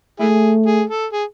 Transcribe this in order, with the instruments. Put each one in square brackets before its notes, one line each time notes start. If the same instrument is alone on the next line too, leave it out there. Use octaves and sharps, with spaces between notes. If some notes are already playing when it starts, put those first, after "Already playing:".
[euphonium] A3 [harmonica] E4 G#4
[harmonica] G#4
A4
G#4